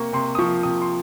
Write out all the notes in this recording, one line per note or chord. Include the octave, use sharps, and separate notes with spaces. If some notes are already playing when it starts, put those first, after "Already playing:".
Already playing: C3 A#3 C#6
C3 C6
D#6
F3 C#6
C3 D#6
C6